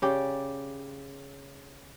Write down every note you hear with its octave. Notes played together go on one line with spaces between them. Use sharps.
C#3 G4 D5